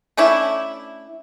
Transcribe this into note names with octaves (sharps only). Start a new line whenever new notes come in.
A3 C#4 D4 E4